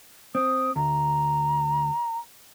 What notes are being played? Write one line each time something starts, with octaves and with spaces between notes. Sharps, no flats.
C4 D#6
D2 A#5